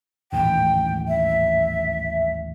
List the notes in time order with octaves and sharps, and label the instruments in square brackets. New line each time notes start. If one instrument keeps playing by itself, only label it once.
[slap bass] D#1 A1 G#2 [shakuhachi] G5
[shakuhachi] E5